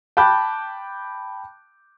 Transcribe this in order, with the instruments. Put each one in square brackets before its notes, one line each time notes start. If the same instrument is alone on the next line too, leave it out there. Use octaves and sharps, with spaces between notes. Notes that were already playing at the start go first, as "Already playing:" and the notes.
[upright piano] G5 A5 B5 D6 F#6 G6